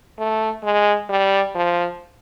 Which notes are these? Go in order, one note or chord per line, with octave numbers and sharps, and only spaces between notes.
A3
G#3
G3
F3